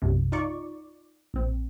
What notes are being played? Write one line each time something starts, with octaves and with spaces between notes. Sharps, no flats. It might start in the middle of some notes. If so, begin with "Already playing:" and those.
B1 F#2 C3
D#4 F4 D5 C#6
A#1 C4